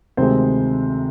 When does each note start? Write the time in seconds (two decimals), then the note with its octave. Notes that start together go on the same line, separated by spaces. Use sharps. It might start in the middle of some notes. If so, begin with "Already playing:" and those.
0.17 D2 C3 D#3 G#3 C4 C5